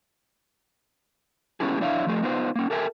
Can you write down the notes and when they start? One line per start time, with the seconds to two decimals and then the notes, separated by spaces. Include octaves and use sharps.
1.60 G#3 B3 C#4 E4 G4 G#4
1.80 F2 D4 E4 C#5 E5 F5
2.07 F3 A3 G#4
2.22 B3 D#4 F4 C5
2.56 A#3 C#4
2.70 G4 A4 A#4 E5 G5 G#5